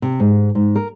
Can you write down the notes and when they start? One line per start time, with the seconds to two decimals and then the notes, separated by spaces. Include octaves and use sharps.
0.02 C3
0.20 G#2
0.55 G#2
0.76 A#4